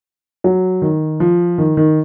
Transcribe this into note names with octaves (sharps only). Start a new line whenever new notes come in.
F#3
D#3
F3
D#3
D#3